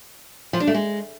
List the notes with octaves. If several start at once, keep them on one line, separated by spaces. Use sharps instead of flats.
F3
D4
A3
G#3